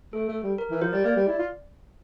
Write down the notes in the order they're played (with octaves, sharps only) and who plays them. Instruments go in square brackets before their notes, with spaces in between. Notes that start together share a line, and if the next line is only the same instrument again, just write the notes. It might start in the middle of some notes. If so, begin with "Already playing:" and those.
[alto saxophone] A3 [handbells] A4
[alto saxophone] A3
G3
[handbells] A#4
[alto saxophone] E3
[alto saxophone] F3 [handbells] C5
[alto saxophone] G3 [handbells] D5
[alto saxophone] A#3 [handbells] D5
[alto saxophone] G3
E4
F4